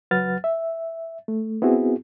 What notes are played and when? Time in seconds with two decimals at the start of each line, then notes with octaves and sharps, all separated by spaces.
0.11 C#2 F#3 B4 F#5 F6 A6
0.44 E5
1.28 A3
1.62 B3 C4 E4 F#4 G#4